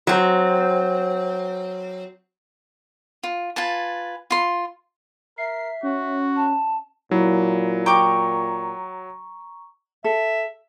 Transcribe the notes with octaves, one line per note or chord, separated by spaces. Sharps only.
F#3 C4
F4
F4 B4 G#5 A5
F4 C6
A#4 E5 C7
C#4 F#4
A5
A#2 F#3 E4
G5 A#5 C#6 D6
A4 E5